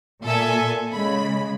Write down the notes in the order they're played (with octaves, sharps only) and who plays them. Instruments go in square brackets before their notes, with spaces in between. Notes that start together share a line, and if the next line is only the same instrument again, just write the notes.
[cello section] A#2 [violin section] A4 E5 G#5
[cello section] C#3 G#3 [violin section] B5